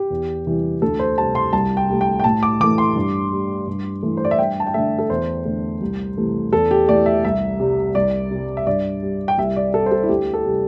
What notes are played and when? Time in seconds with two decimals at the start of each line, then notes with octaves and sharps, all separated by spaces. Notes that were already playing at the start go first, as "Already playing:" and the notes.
Already playing: G4
0.10 E2
0.46 C3 E3 G3
0.82 D2 A4
0.99 C5
1.18 C3 G3 A5
1.35 C6
1.53 C2 A5
1.77 G5
1.90 C3 A3
2.01 G5
2.20 G5
2.24 A2 A5
2.43 D6
2.60 E3 A3 D6
2.78 C6
2.96 G2
3.32 G3
3.67 G2
4.03 E3 A3
4.17 C5
4.25 D5
4.31 E5
4.39 G2 G5
4.60 A5
4.67 G5
4.74 D3 A3 E5
4.98 A4
5.10 E2 C5
5.45 D3 A3
5.81 C2
6.17 C3 E3 A3
6.53 E2 A4
6.71 G4
6.88 E3 A3 D5
7.06 E5
7.25 C2 E5
7.60 C3 G3
7.95 C2 D5
8.31 C3
8.36 G3
8.57 E5
8.67 G2 D5
9.03 G3
9.28 G5
9.38 C2 E5
9.56 D5
9.74 C3 G3 A4
9.86 C5
9.92 A4
10.03 E4
10.09 D2 G4
10.34 A4
10.46 C3 G3